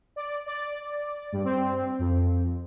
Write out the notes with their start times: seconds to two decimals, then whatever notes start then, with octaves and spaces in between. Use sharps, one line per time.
0.16 D5
0.46 D5
1.32 G2
1.45 C4
1.99 F2